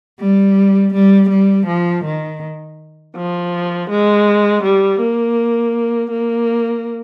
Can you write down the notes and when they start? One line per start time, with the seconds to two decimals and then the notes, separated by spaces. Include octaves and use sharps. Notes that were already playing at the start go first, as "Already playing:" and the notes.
0.20 G3
0.93 G3
1.29 G3
1.67 F3
2.04 D#3
3.15 F3
3.88 G#3
4.63 G3
4.99 A#3
6.10 A#3